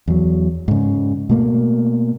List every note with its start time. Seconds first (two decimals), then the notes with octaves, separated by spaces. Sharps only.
0.08 E2 F#3
0.68 G#2 C#3
1.29 B2 A3 A#3